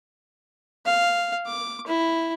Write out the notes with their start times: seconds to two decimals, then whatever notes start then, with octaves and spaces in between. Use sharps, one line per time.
0.86 F5
1.47 D6
1.87 E4